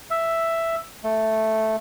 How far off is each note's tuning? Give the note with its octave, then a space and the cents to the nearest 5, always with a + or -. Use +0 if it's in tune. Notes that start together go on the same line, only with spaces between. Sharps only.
E5 +5
A3 +0